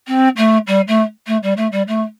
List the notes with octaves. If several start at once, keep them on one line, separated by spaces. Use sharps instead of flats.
C4
A3
G3
A3
A3
G3
A3
G3
A3